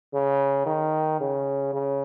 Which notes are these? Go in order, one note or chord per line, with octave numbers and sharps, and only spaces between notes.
C#3
D#3
C#3
C#3